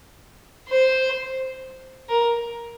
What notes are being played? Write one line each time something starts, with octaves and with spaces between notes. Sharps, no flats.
C5
A#4